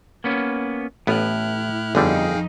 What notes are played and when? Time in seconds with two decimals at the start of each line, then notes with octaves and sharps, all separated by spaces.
0.24 A#3 B3 C#4
1.07 A1 A2 B3 E4 F6 F#6
1.95 G1 F2 D3 G3 D#4 G#4 F5 G5